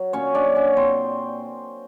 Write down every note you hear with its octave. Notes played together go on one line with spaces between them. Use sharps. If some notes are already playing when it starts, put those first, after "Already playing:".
Already playing: F#3
A#2 C#4 C#5
D4 D5
F#3
C#4 C#5
A#2 C4 C5